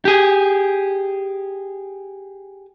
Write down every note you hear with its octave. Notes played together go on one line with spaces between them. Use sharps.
G4 G#4